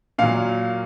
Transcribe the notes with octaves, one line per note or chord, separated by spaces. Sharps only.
A#2 F#3 F5